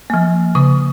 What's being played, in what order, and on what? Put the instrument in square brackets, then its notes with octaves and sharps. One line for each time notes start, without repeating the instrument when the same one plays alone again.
[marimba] F3 A#3
C#3 D#6